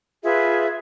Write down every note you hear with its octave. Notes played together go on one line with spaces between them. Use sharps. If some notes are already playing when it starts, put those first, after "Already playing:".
F4 G#4 B4 E5